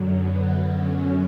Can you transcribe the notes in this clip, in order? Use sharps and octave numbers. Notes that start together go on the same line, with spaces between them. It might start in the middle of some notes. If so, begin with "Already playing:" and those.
Already playing: F#2 D3 F#3
B3
F#2 D3 F#3 C#4